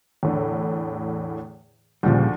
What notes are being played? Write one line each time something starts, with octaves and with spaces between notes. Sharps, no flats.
E2 A2 D3
D2 A#2 C#3 F3 G3